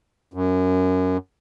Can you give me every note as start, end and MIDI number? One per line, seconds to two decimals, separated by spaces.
0.34 1.17 42